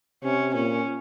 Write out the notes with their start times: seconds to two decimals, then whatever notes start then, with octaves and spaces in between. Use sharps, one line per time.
0.24 C3 C#4
0.54 A#2 C#4